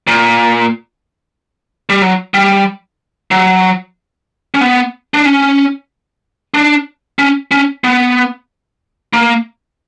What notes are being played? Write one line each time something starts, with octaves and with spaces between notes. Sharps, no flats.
A#2
G3
F#3
G3
F#3
C#4
B3
D4
C#4
D4
C#4
C#4
B3
A#3